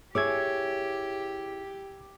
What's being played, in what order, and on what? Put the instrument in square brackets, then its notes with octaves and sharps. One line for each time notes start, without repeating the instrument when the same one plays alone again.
[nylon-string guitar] E4 G#4 C#5 [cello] G4 [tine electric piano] D6 E6 G#6